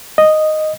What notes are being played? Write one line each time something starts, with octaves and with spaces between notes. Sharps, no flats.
D#5